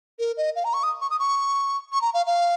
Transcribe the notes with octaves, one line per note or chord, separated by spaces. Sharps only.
A#4
D#5
F5
A#5
C#6
D#6
C#6
D#6
C#6
C#6
A#5
F5
F5